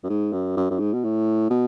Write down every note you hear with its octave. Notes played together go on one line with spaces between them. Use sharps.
F#2
G#2
F#2
F#2
F#2
G#2
B2
A2
B2